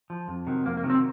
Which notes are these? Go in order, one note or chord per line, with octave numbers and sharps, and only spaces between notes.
F3
F2
C3 D#3 F#3
F2 A#3
A#3
C3 D#3 F#3
C4